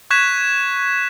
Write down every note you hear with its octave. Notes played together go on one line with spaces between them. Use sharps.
C#6 F#6 G#6 B6 E7